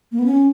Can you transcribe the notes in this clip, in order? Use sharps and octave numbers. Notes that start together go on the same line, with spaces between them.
A#3
B3
C#4